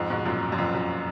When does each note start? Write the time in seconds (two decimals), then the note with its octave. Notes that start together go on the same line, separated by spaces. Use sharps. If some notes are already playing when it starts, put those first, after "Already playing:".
Already playing: F2 G#2
0.10 G#2 B2
0.25 F#2 A#2
0.52 F#2
0.58 F2
0.74 F#2